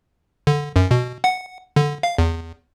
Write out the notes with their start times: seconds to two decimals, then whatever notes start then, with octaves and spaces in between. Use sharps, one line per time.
0.47 D3
0.76 F#2
0.91 B2
1.24 F#5
1.76 D3
2.03 F5
2.18 E2